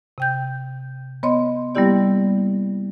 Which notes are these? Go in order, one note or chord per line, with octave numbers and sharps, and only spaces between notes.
C3 G5 G6
B3 C#5 D#5 C6
G3 A#3 B3 E4 G4 D5